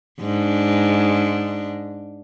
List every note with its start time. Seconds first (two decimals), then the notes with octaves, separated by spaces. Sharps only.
0.21 G#2 D4